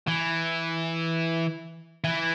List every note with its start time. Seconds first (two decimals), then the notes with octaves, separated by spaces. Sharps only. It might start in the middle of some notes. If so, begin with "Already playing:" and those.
0.07 E3
2.04 E3